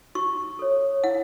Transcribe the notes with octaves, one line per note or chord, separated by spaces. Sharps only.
F#4 C#6
A4 C#5
E4 F#5